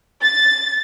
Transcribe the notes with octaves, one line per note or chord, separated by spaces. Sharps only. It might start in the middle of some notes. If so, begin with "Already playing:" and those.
A6